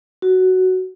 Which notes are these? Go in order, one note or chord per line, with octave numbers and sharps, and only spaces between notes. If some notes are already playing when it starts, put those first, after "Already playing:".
F#4